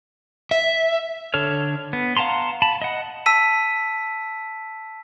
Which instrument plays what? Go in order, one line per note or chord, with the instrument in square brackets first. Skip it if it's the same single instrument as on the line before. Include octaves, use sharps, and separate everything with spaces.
[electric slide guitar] E5
[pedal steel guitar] D3 A4 C#5 F6
B3
F5 F#5 A5 A#5 C6
A5 B5
D#5 F#5
[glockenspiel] A5 E6 B6 D#7